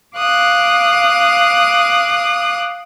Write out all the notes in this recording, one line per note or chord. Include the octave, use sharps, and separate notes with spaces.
F5 D6 D#6 F#6